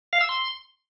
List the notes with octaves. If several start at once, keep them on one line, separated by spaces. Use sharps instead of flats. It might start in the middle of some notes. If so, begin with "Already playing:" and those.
F5
E6
C6